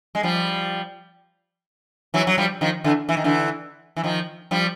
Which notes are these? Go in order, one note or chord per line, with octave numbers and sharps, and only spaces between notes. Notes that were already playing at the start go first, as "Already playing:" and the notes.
G#3
F3 G3
E3 F#3
F#3
F3 G3
D#3 F3
D3 E3
E3
D#3
D3 E3
E3
D#3 F3
F3 G3